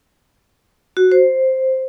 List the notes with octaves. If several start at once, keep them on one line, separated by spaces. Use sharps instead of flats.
F#4
C5